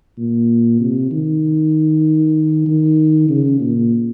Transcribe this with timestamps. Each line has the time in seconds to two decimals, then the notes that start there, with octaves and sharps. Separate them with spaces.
0.17 A#2
0.80 C3
1.11 D#3
2.66 D#3
3.29 C#3
3.59 A#2